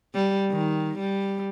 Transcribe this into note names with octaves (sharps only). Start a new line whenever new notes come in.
G3
D#3
G3